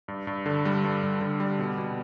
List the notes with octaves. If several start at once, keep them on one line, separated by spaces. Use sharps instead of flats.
G2
G2
D3
G3
G2
G2
D3
G3
B2
B2